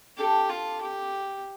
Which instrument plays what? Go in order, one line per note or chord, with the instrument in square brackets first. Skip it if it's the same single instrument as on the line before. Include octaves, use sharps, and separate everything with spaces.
[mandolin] D4 A4 D5 [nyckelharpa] G4
[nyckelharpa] F4
G4